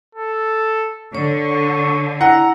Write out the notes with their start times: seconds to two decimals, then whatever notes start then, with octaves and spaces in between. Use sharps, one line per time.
0.15 A4
1.15 D3 C#5 C#6
2.21 E4 F#5 A#5